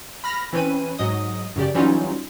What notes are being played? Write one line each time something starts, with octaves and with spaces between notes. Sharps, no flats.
B5 F6 A#6
E3 C4 C#4 B4 D#7
G#2 F#3 D#5 D#6
F#2 C#3 G4 D5
E3 F#3 G3 C#4 D#4 F4